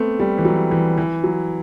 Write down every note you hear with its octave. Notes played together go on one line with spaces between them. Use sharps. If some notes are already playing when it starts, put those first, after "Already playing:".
Already playing: A3 B3 C4
G3
E3
F#3
E3
E3
F#3